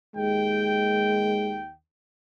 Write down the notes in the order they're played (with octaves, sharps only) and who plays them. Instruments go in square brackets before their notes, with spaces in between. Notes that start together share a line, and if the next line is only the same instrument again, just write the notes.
[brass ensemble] D#2 G5 [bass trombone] G#3